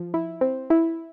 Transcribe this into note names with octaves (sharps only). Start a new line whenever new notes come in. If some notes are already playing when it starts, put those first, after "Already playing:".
Already playing: F3
E4
C4
E4